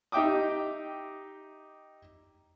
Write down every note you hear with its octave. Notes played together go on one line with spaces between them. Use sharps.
D#4 G4 E5 G5 D6 D#6